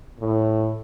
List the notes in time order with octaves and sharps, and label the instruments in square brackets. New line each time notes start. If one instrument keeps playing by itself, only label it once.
[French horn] A2